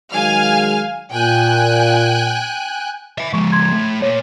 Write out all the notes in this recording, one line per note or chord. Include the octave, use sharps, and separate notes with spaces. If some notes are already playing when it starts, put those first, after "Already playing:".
D#3 F#3 G#3 F5 G#5 F6
A#2 G5 G#5 F#6
E5 G#5
F3 G#3 C#6
C6 G#6
A2
A#2 C#5